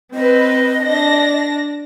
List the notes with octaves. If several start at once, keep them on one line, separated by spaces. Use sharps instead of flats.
C4 B4 D#5
D4 A#6